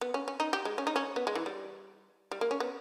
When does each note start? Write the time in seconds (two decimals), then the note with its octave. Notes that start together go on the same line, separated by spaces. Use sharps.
0.01 B3
0.14 C#4
0.28 C#4
0.40 D#4
0.53 G4
0.65 G#3
0.78 C#4
0.87 D#4
0.96 C#4
1.16 B3
1.27 G#3
1.35 E3
1.46 G3
2.31 G3
2.41 A#3
2.51 C#4
2.60 B3